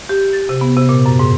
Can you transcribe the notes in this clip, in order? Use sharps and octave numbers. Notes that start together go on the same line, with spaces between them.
G4
A6
C3
B3
C3
A#2
F#2
G#2